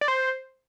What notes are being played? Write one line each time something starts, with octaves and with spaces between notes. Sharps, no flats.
D5
C5